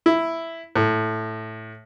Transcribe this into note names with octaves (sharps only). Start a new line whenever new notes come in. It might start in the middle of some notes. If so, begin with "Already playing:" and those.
E4
A2